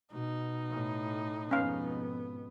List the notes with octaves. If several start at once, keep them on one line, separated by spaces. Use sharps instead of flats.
B2 D#4
A2
F2 G#2 B2 B3 C#4 F5